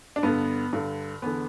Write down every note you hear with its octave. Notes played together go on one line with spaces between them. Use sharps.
D4
G2 D3 B3
G2 D3
E2 D3 B3